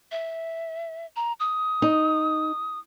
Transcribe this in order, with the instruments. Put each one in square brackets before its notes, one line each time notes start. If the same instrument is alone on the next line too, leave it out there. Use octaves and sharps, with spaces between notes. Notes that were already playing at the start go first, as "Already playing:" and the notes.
[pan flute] E5
A#5
D#6
[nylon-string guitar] D#4